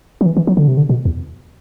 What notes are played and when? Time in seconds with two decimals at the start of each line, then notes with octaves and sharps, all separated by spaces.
0.21 F#3
0.26 E3
0.37 E3
0.47 F#3
0.57 D3
0.68 C3
0.77 D3
0.89 B2
1.05 E2